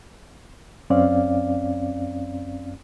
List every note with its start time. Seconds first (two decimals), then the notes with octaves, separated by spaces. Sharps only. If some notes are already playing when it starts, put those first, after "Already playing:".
0.90 F#2 C4 C#4 D5 F5